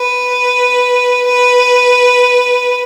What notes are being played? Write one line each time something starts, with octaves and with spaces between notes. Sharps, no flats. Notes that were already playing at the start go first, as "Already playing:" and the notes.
Already playing: B4
B4